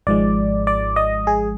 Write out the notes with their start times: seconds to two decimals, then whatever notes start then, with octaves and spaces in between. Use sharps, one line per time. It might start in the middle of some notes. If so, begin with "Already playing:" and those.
0.07 G#1 G#2 F3 G#3 D5
0.67 D5
0.96 D#5
1.27 G#4